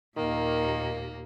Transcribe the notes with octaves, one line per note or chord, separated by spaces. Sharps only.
D#2 A#2 D#3 A#3